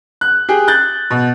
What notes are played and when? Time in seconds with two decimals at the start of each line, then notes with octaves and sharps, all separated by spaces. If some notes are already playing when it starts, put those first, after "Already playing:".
0.21 F#6
0.49 G4 G#4
0.68 F#6 G6 A6
1.11 B2